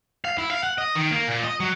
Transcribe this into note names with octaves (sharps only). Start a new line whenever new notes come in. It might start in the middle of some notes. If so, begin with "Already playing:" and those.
F5
E4
F5
F#5
D#5
D#3
A#3
A#2
D#5
F#3